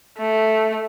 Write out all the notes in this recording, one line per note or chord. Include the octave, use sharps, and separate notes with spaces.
A3